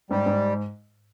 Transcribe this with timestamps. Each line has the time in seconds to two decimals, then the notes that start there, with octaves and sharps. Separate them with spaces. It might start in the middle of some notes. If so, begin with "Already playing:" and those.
0.10 G#2 G3
0.26 G#2